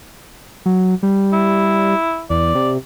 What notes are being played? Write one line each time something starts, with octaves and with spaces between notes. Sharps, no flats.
F#3
G3
E4
E2 D5
C3